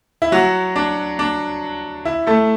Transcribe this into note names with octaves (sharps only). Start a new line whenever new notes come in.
E4
F#3 F#4
D4
D4
E4
A3 A4